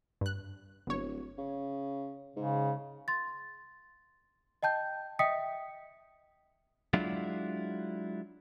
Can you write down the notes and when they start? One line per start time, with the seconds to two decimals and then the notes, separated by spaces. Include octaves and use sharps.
0.21 G2 F#6
0.87 D1 G1 C#5
1.38 C#3
2.36 G#2 C#3
3.08 C6 A6
4.63 D#5 G5 A5 G6
5.19 D#5 E5 G5 D#6 B6 C#7
6.93 F#3 G#3 D4 E4 F4